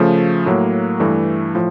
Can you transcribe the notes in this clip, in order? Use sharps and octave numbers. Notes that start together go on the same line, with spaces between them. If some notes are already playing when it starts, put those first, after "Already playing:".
Already playing: C#3 F3 A3
A2 F#3 A#3
G2 E3 A3
A2 F3